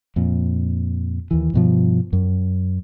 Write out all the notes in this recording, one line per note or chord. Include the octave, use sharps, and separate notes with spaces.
F2 A#2
D#2 E3
G2 B2 F3
F#2